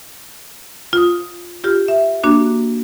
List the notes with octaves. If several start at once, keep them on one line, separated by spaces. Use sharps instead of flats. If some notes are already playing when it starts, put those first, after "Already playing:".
F4 D#6
F4 G4 F6
E5
A#3 D4 F#4